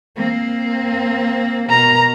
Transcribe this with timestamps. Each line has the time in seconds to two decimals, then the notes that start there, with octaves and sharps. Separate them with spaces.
0.16 A#3 C4
1.70 B2 A#4 A#5